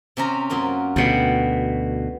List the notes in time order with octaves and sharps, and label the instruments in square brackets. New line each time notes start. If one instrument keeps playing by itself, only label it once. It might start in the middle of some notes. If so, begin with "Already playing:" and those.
[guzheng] C3 C#4 A#5
F#2 A#3 F4
[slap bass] D2 B2 [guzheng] G3 B3